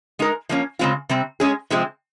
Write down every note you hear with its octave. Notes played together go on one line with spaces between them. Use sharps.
G#3 D#4 A#4
F3 A#3 C#4
C#3 G#3 C4 F4
C3 G3 C4
G#3 C#4 G#4
C3 F3 G#3 C4